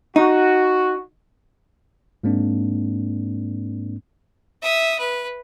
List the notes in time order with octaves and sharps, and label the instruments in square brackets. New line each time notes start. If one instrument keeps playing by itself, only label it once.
[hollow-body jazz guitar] D#4 [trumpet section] F#4
[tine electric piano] G#2 G#3 A#3 C4 D4
[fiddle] E5 D#6
B4